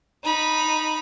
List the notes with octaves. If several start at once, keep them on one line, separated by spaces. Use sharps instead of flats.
D#4 B5